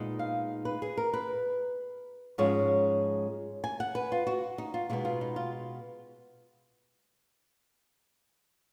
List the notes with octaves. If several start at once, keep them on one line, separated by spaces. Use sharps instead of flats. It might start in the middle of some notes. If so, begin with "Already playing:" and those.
Already playing: A#2 G#3 B3 D#4
F5
B4
G#4
A#4
B4
G#2 F3 G#3 C#4 C#5
G#5
F#5
B4
F4
F#4
D#4
F4
B2 G#3 B3 D#4 F4
F4
D#4
F4